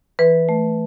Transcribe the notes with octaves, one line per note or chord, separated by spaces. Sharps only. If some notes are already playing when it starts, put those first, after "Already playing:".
E3 B4
A3